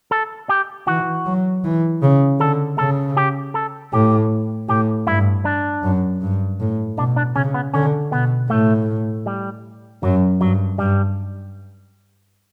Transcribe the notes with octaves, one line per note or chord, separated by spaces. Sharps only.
A4
G4
E3 F#4
F#3
E3
C#3
D3 A4
C#3 A4
G4
A4
A2 G4
A2 G4
G2 E4
D4
F#2
G2
A2
B2 D4
D4
C#3 C#4
B3
D3 C#4
B2 B3
A2 A3
G3
F#2 F#3
G2 F#3
G2 G3